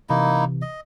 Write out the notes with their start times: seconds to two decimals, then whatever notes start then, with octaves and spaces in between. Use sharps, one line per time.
0.09 C3 E3 A#3 D#4 E4
0.62 D#5